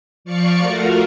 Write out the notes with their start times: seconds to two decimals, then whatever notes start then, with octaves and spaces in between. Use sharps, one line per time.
0.25 F3 D5 F5 C#6 C#7
0.59 A3 F4 F#4 A#4